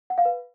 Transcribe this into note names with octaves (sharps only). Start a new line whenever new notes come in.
F#5
F5
B4